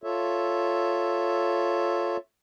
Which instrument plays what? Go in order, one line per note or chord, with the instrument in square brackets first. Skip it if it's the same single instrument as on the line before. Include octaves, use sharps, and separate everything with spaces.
[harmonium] F4 A4 C#5 E5